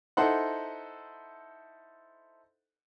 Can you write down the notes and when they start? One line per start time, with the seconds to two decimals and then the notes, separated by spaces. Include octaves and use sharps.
0.17 D#4 E4 A4 C5 F#5